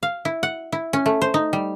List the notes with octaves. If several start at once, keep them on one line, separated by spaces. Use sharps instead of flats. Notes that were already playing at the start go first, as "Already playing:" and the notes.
F5
E4
F#5
E4
C#4
A3
C5
D#4
G3